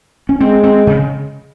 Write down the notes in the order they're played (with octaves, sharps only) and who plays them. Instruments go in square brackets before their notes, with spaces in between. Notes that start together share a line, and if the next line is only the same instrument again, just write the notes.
[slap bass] C#4
[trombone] G#3 [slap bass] C4
[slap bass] C4
C#3